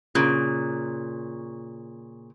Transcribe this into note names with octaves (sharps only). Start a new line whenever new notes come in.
A#2 C#3